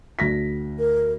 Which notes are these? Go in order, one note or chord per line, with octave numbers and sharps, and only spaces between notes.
D2 A#6 B6
A#4